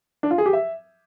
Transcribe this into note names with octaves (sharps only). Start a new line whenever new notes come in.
D4
F4
G#4
G4
E5